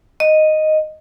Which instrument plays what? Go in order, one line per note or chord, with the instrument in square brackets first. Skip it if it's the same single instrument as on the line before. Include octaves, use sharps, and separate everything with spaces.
[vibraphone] D#5